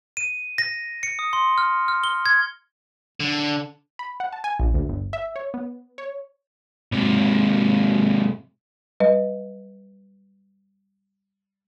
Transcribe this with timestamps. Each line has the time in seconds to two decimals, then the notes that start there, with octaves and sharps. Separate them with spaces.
0.17 D#7
0.58 A#6
1.03 C#7
1.19 D#6
1.33 C6
1.58 F6
1.88 F6
2.04 G7
2.26 G#6
3.20 D3
3.99 B5
4.20 F#5
4.33 A5
4.44 G#5
4.60 A#1
4.74 D2
4.89 G1
5.13 E5
5.36 C#5
5.54 B3
5.98 C#5
6.93 G#2 C3
9.00 G3 B4 D#5